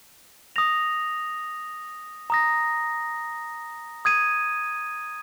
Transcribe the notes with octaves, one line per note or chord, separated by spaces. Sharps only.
D#6 A#6 F7
A#5 D#6 A#6
D#6 G#6 D#7